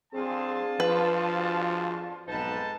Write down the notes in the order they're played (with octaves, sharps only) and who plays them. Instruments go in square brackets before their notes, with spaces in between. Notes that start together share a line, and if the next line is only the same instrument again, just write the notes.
[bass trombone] C4 [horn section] D4 F4 A5 [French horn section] G#4
[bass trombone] F3 [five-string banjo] B4
[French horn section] F#4 G#4 C5
[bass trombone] B1 [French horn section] F2 B3 B4 [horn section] G#2 D#4 A5